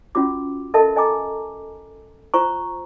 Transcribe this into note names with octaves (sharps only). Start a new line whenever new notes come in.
C#4 F4 F#4 D6
A4 A#4 D#5 E5 A5 B5
D#5 G#5 A#5 D6
F4 C5 A#5 C#6